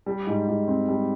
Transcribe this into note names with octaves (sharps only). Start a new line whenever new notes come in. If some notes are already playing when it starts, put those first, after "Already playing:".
G3
G#2
G#2
C4
G3